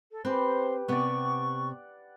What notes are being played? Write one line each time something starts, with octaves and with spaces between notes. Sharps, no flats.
A4
C4 G4 B4 C5
C3 B3 D5 F#5 C#6